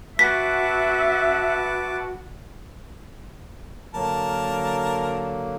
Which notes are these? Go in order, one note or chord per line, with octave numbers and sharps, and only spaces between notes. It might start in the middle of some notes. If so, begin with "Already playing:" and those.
F#4 B4 E5 A5 D6 B6
D3 F#3 A#3 A#4 A5